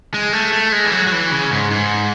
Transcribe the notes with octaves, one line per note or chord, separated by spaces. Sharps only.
G#3
A3
A3
G#3
E3
F#3
F#3
E3
C#3
G#2
G#2